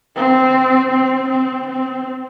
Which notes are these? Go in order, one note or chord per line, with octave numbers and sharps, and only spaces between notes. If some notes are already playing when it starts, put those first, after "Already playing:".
C4
C4
C4
C4